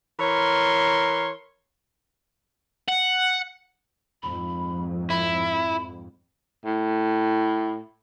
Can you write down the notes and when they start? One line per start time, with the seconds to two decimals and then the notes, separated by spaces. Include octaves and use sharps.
0.19 E3 A#4 C#5 C6
2.88 F#5
4.23 F2 G#2 B5
5.10 E4 B5
6.65 A2